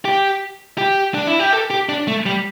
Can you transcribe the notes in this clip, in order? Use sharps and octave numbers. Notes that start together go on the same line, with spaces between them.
G4
G4
D4
E4
G4
A4
G4
D4
A3
G3